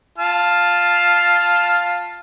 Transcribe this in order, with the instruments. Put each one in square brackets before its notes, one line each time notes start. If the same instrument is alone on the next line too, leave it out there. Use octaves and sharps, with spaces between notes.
[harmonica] F4 A5 F6